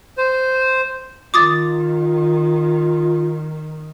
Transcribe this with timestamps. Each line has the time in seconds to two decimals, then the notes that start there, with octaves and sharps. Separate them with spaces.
0.18 C5
1.34 D#3 F4 D6 D#6 A6